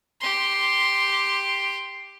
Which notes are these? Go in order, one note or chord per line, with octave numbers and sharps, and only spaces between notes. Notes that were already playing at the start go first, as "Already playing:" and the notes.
G4 C6